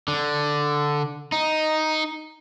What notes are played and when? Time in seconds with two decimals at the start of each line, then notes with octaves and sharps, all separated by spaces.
0.08 D3
1.32 D#4